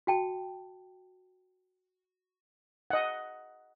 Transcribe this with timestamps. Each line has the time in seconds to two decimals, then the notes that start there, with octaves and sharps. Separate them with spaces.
0.07 F#4 G5 A5
2.90 D#5 F#5